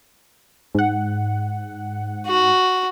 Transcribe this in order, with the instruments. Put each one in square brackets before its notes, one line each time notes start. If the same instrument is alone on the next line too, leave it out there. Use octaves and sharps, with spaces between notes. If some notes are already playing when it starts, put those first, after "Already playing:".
[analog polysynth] G#2 F#5
[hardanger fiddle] F#4